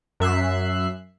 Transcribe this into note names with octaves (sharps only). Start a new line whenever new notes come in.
F#2 E5 F#6 C7